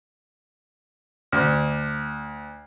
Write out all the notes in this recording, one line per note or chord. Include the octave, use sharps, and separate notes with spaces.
D2